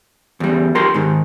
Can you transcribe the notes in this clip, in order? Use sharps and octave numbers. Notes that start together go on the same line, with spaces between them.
E2 G3
F4 G4 A#4 C6
G#2 D#3